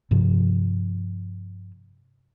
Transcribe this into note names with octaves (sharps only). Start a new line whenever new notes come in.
G2 C3 F3